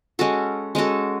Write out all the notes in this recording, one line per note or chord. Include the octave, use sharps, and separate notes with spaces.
G#3 C#4 F#4 A4
G#3 C#4 F#4 A4